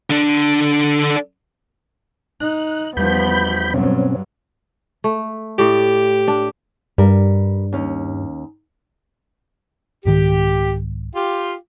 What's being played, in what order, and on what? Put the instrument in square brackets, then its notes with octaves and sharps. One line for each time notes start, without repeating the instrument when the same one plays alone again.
[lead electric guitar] D3 D4
[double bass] D#4 [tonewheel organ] F#6
[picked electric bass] E2 G3 [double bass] F3 B3 [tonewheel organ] B5 G6
[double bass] G2 F#3 [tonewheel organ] B2 C4 C#4
[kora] A3
[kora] A2 D5 [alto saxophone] G4
[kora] D4
[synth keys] G2 [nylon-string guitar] G3 A#4
[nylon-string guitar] D#2 C#4
[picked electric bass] C2 G#2 D#3 [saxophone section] G4
[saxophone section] F4 G4